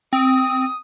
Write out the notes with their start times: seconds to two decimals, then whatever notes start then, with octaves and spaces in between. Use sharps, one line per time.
0.13 C4 D#6